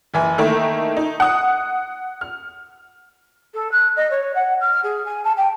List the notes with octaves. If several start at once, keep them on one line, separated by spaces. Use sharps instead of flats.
F#1 E3 G#5
D#3 A3 A#3 D#4 E4
D#4
F#5 D#6 F#6
F6
A4
F#6
D#5
C#5
F#5
F6
G#4
G#5
A5
G5